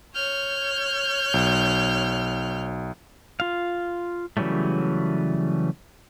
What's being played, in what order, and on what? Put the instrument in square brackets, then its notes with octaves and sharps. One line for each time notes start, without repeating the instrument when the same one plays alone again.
[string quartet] C#5 F6 G6
[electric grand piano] B1
[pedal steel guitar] F4 F5
C#3 E3 F#3 G3 A3